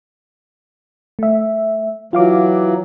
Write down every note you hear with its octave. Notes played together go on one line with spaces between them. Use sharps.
A3 E5
E3 F#3 F4 F5 D6